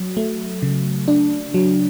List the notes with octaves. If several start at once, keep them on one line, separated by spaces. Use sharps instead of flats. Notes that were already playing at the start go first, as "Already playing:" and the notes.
Already playing: F#3
A3
C#3
D4
F#3